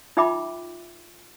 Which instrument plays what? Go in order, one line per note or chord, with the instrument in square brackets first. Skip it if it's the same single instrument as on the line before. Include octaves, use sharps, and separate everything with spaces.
[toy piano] D#4 F4 E5 G5 B5 D6